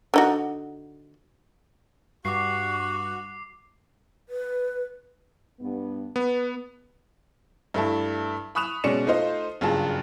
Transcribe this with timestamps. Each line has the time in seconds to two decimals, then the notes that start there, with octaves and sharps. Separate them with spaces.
0.14 D3 D#4 F#4
2.25 G2 F#4 C#6 D6 C7
4.29 B4
5.60 G2 B3
6.16 B3 B4
7.74 G2 A3 E4 A5
8.55 B5 C#6 D#6 F#6 E7 F7
8.84 B2 G#3 C#4 D5 C#7 E7
9.06 A3 D#4 F4 C5 D#5
9.61 F#1 G2 F4 G#4 A5